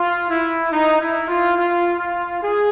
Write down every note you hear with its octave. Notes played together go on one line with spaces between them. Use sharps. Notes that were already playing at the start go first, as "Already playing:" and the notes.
Already playing: F4
E4
D#4
E4
F4
F4
F4
G#4